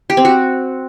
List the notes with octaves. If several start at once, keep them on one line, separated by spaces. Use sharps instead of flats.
G4
C4
F#4